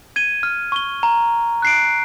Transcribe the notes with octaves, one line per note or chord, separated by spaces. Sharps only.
G#6 D#7 G7
F6
C#6 G7
A#5
F#6 C7 D7